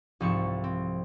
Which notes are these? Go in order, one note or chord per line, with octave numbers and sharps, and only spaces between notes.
C2 G#2 F3 A4 C#6 E7
C4